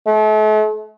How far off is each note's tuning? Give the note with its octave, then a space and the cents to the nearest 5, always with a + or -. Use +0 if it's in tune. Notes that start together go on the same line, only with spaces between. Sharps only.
A3 -40